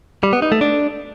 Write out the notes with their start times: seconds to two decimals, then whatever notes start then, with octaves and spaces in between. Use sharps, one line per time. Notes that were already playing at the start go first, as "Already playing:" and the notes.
0.23 G3
0.33 B3
0.42 D#4
0.52 A3
0.61 D4